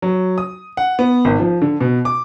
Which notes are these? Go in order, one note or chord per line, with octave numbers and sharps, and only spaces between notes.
F#3
D#6
F#5
B3
G#1
F3
D3
B2
D6